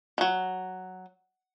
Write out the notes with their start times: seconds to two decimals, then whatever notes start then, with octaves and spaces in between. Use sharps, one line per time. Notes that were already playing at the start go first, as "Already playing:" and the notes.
0.18 D#3 F#3